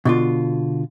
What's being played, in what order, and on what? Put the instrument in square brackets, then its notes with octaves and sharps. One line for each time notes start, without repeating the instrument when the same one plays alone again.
[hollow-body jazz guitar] B2 D3 F4